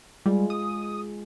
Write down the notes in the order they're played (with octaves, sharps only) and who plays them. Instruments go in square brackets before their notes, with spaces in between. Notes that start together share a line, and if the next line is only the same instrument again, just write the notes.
[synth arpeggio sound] G3 [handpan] G#3 F4 G#4
[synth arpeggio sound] D#6